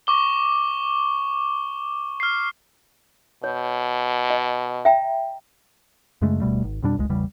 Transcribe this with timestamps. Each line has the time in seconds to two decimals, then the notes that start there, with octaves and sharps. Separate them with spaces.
0.07 C#6 D6 G7
2.20 F6 C7
3.44 B2 C#5
4.30 D#5
4.85 E5 G5 A#5
6.22 F#2 C#3 G#3 A3
6.40 D1 B2 G3 A3
6.64 G#1
6.83 F2 B2 G3 D4
6.97 F1 C#2 G#3
7.09 A1 E2 C#3 G3